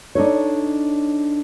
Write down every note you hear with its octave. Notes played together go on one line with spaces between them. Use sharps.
D4 D#4 A4 C#5